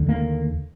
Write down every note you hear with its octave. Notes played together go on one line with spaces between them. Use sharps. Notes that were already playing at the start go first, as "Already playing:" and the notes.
Already playing: D#2 D3
A#3